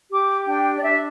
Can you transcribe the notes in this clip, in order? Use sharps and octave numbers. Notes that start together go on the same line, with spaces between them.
G4 D6
D4 G5
D5
D4 E5